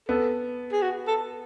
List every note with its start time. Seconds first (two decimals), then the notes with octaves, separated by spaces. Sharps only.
0.08 B3 A4
0.72 G#4
0.82 F#4
1.07 A4